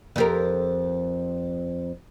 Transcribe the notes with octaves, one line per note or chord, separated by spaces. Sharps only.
F2 G4 A#4